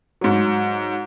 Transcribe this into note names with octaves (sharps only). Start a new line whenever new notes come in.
G#2 F#3